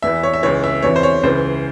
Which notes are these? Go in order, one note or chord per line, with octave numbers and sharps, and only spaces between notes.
E2 E3 E5
C#5
E5
C#2 C#3 E3 C#5
E5
E2 C3 E3 C#5
C5
C#5
C#2 C#3 E3 C5